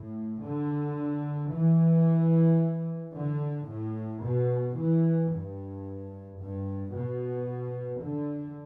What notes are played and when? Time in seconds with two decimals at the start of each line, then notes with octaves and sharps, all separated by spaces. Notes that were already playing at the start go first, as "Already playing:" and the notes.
Already playing: A2
0.43 D3
1.51 E3
3.14 D3
3.68 A2
4.22 B2
4.76 E3
5.30 G2
6.39 G2
6.93 B2
8.01 D3